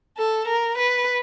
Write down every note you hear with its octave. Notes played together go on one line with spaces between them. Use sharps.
A4
A#4
B4